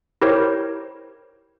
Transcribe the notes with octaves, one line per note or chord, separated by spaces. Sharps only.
E4 G4 A#4 C5 C#5